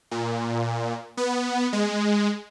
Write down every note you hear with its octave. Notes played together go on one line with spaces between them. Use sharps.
A#2
B3
G#3